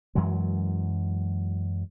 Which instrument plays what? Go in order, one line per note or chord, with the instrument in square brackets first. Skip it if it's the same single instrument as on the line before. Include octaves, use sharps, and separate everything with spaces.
[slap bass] F#2 E3 F#3 G#3